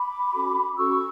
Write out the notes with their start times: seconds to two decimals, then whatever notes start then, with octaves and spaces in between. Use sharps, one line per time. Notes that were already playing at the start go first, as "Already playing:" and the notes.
Already playing: B5 D6
0.33 C#4 F#4 A4
0.77 C#4 F#4 A4 C#6 E6